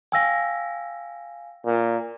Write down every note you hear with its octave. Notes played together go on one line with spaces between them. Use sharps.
F5 G5 G#5 E6 A#6
A#2